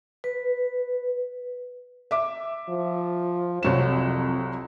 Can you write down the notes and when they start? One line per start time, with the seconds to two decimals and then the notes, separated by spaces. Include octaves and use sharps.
0.24 B4
2.11 E5 D6
2.69 F3
3.63 C2 F2 F#3 E7